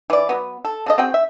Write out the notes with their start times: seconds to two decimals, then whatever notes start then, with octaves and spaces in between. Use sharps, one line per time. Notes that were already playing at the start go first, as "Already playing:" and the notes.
0.10 E3 D5
0.29 F#3 B3
0.65 A4
0.86 C#3 A4 D#5
0.98 C4 F#4 G#4 G5
1.14 E5